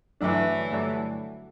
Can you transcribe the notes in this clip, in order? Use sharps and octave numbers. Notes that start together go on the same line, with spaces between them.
G2 D3 E3 F#3 A3 D4
G2 D3 F#3 A3 D4